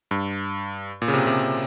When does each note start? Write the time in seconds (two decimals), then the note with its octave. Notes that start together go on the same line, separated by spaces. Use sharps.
0.11 G2
1.02 A#2
1.08 C#3
1.14 C3
1.27 C3